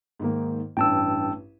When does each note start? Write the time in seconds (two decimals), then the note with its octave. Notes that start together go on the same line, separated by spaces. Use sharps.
0.19 G#2 D#3 A#3
0.77 A1 G2 G5 A5 E6